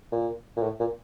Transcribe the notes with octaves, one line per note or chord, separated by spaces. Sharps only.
A#2
A#2
A2
A#2